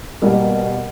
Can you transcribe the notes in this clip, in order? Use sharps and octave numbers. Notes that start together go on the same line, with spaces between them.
B2 G3 A#3